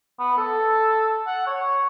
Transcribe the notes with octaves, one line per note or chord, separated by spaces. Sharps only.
B3
A4
F#5
C#5